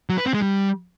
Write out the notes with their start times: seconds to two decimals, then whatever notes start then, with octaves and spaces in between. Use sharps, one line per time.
0.09 F#3
0.18 B4
0.26 C4
0.34 G#3
0.42 G3